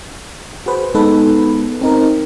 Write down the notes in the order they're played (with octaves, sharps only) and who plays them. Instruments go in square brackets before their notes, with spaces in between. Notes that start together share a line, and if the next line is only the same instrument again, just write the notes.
[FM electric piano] F#4 G#4 B4 C5
G#3 B3 D#4 A4 B4
C4 D#4 A#4